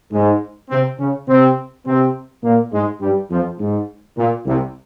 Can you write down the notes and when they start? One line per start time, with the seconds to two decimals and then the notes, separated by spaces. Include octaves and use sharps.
0.12 G#2 G#3
0.70 C3 C4
0.99 C#3 C#4
1.28 C3 C4
1.85 C3 C4
2.44 A#2 A#3
2.72 G#2 G#3
3.01 G2 G3
3.30 F2 F3
3.59 G#2
4.17 A#2
4.46 C2 C3